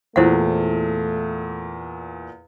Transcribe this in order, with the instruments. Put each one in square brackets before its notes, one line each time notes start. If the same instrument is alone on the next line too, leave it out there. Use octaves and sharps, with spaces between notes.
[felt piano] E2 A#2 [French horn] A3 [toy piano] E4 C5 F#5